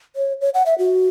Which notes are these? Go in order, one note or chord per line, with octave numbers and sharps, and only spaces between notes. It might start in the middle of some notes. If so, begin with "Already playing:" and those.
C#5
C#5
F#5
E5
F#4